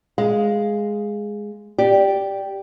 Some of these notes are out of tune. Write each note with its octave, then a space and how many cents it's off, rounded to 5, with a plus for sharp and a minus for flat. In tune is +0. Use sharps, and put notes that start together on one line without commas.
G#3 +0 F5 -5
G4 +0 D5 +0